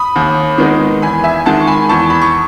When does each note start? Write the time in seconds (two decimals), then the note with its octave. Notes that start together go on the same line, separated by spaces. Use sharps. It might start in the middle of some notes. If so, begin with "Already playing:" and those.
Already playing: B5 D#6
0.16 D#2
0.58 D#3 G#3 B3 D#4
1.02 E2 G#5 B5
1.24 E5 G#5
1.46 D#3 G#3 F#5 A5
1.61 C#6
1.67 G#5 B5
1.89 E2 A5 C#6
2.10 B5
2.22 C#6